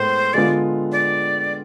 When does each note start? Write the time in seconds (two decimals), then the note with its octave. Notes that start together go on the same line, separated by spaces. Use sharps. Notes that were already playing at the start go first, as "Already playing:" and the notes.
Already playing: A2 G#3 B3 C5
0.34 D3 G#3 B3 F4 D5
0.92 D5